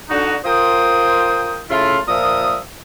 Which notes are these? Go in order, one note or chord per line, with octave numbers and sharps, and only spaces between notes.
D3 D#4 F#4
F4 A#4 C5 G5 D#6
C#3 A3 E4 F4
A#2 F3 A#4 E5 D#6